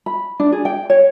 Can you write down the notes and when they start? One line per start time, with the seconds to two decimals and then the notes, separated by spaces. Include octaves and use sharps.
0.06 B5
0.40 D4
0.52 G#4
0.65 G5
0.90 C#5